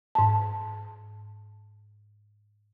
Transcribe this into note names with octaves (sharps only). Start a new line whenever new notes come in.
G#2 A5